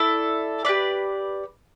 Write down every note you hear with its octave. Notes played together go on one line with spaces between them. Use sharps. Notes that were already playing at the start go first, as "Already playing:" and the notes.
Already playing: E4 A4 D5
G4 B4 D5